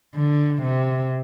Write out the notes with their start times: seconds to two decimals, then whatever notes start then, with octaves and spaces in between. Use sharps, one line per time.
0.15 D3
0.62 C3